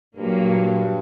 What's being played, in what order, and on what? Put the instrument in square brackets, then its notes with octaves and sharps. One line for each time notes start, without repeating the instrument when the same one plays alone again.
[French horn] G2 [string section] A#2 F#3 A#3